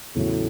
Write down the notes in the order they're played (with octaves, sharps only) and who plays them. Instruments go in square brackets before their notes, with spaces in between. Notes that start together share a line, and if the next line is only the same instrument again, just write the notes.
[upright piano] E2 C#3 F#3 A3 [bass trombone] A2